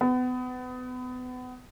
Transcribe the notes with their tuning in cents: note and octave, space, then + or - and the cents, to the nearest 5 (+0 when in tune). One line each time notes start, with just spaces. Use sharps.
B3 +30